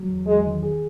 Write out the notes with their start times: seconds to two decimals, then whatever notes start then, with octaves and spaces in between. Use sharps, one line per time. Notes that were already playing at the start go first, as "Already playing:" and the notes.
Already playing: F#3
0.09 E2
0.27 E2 G#3
0.45 D#3
0.63 G#4